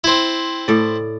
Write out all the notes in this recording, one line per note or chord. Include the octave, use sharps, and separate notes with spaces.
C4 E4
A2 D5